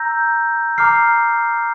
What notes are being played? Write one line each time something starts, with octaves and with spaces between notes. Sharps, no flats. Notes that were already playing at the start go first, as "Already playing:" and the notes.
Already playing: A#5 E6 G6 A#6
A#5 D6 F6 C7